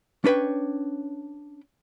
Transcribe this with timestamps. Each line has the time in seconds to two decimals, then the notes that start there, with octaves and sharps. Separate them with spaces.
0.24 C#4 D4 B4 C#5 G5